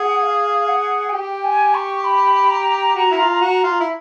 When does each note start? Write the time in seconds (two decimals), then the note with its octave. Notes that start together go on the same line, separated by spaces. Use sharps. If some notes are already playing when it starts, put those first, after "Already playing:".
Already playing: G#4 F#5
0.23 F5
0.68 F#5
1.09 G#5
1.13 G4 G5
1.44 G#5
1.75 C#6
2.04 B5
2.50 A#5
2.95 F#4
3.11 E4
3.18 F4
3.41 F#4
3.64 F4
3.80 E4